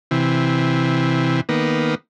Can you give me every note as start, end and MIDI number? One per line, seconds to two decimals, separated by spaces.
0.11 1.41 48
0.11 1.41 52
1.49 1.95 51
1.49 1.95 58
1.49 1.95 59